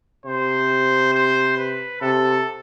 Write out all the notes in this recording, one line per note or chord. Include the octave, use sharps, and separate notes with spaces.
C3 C5
C5
B4
C3 A4